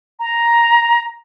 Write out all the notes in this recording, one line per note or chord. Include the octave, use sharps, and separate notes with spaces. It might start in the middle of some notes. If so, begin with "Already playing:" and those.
A#5